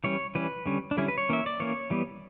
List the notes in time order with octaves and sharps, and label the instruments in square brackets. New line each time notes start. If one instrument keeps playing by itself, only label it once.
[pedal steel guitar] E3 G3 C#4 C#5
E3 G3 C#4 B4
D3 G3 C#4
D4
D3 G3 C#4 E4
B4
C#5
E3 A#3 C#4 E5
D5
E3 A#3 C#4 C#5
E3 G3 B3